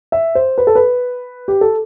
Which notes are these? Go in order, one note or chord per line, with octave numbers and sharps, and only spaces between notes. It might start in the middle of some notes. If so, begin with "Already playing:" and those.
E5
C5
B4
A4
B4
G4
A4